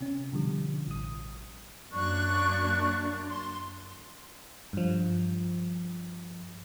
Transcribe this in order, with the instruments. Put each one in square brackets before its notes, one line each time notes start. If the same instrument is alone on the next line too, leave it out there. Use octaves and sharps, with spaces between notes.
[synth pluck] C3 C#4
B2 D3 F3 G3
A1 D#6
[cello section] F#2 A#3 D4 [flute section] C#6 F#6
[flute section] C6
[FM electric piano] G2 F3